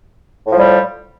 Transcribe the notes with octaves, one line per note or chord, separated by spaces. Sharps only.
A2 F3 G3